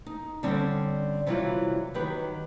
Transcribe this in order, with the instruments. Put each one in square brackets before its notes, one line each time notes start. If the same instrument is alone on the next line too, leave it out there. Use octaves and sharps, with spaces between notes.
[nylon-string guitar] D#4
D3 G3 C4 C#4 C#5
C3 E3 F#3 G3 E4 F4
D#3 F#3 G4 B4